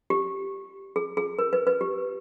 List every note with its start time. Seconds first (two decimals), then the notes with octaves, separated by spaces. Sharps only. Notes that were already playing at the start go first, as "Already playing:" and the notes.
0.10 G4
0.96 G#4
1.17 G#4
1.39 A#4
1.53 B4
1.67 B4
1.81 G4